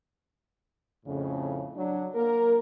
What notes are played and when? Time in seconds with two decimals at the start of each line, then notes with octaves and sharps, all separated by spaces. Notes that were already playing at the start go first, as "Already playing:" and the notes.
1.06 F2 A2 C#3
1.76 F#3 D4
2.15 A#3 A#4